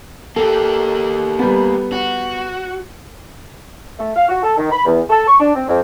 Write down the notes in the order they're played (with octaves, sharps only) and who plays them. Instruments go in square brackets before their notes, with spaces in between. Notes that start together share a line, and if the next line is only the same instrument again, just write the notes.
[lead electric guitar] A#3 G4 [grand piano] A4
[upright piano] G3 B3
[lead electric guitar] F#4
[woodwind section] A3
F5
F#4
A4
D#3
B5
E2
A4
C#6
D4
C4
F2